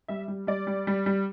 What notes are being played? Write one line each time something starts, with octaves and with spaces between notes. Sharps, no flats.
G3 E5
G3
G3 D5
G3
G3
G3